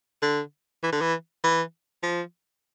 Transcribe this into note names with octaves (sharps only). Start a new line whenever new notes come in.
D3
E3
D3
E3
E3
F3